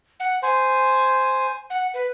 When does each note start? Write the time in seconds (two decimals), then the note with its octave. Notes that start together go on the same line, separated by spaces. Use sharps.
0.20 F#5
0.42 C5 G#5
1.70 F#5
1.94 B4